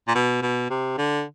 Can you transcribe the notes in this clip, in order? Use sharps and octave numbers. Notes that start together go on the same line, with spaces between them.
A#2
B2
B2
C3
D3